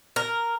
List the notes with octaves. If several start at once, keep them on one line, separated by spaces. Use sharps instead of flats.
A#4